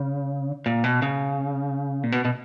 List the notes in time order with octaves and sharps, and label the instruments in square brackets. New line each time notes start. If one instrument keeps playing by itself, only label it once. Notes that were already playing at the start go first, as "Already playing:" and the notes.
Already playing: [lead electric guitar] C#3
A#2
B2
C#3
A#2
B2
B2